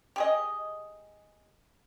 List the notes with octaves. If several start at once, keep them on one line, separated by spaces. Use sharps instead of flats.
G4 G#4 D#5